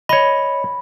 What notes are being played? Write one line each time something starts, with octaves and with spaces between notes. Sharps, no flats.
C#5 D#5 B5